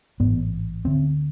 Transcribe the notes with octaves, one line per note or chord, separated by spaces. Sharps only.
A1 G#2 B3
D2 D3 C4